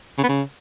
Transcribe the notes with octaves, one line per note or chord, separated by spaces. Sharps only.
C#3
B3
C#3